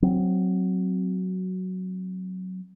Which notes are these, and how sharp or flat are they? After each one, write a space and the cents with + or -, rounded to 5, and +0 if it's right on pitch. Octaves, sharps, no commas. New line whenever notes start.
F#3 +5 C4 +0